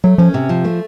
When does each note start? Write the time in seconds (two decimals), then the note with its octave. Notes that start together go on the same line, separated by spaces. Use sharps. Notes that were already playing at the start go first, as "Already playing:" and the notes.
0.04 F#3 A3
0.18 F3 C#4
0.34 C3
0.49 F3
0.65 A3